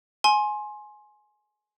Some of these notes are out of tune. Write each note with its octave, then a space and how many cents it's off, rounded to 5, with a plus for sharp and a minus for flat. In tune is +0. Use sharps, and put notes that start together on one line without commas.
G#5 +15 C6 +20